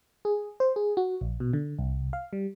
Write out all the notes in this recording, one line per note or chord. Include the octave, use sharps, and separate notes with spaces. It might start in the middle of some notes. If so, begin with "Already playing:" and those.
G#4
C5
G#4
F#4
A#1
B2
D3
C2
F5
G3